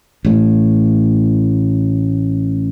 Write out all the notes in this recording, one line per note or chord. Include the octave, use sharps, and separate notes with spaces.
A1 A2